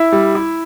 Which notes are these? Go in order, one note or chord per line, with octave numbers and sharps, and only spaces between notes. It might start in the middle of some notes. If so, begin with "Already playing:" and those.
Already playing: E4 E5
G3
E4